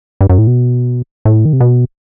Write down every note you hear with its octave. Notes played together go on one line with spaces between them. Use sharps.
G2
F#2
A2
B2
A2
D#3
C3
B2